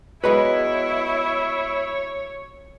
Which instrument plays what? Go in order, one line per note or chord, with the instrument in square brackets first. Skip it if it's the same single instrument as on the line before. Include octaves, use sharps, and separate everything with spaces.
[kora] F#3 G#3 B3 [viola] E4 [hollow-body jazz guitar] B4 B5 [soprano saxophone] C#5